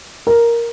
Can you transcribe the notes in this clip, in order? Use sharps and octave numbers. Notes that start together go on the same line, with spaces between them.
A#4